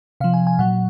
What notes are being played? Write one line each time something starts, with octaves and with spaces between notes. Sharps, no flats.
C3 F3 F5
G#5
G#5
A#2 F#3 F#5